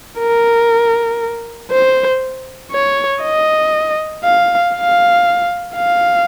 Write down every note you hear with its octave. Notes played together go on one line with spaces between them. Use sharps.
A#4
C5
C#5
D#5
F5
F5
F5